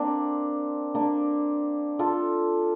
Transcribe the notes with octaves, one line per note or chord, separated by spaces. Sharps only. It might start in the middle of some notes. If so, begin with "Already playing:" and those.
Already playing: A#3 C4 D4
A#3 D4
F4 A4